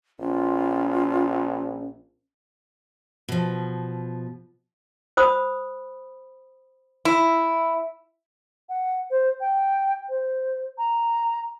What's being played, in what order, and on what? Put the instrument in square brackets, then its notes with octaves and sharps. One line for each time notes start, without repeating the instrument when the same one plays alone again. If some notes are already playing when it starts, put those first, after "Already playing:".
[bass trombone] A#1 [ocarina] C#4 [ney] F4
[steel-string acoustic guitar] B2 F3
[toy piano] C5 B5 D#6
[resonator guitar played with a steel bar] E4
[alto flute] F#5
C5
G5
C5
A#5